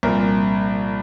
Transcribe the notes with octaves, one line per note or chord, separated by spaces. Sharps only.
C2 A#2 F3 A#4